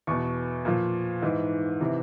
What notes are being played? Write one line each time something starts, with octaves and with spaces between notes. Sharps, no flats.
E2 B2 C#6
A#2 F3
G#2 E3
C3 E3